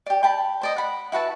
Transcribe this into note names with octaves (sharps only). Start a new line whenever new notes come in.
G4 D5
G5 A5 B5
C5 D5 D#5
F#5 B5
E4 F#4 B4 A5